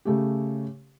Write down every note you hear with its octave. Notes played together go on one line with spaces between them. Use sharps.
C#3 A3 G4